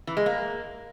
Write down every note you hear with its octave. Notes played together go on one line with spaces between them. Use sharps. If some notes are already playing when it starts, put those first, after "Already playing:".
E3
G#3
A#3